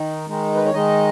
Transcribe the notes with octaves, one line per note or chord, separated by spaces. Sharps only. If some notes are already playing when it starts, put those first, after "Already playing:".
Already playing: D#3 D#4
D#3 G#3 D#4
B4
C#5
D#3 G#3 D#4 D#5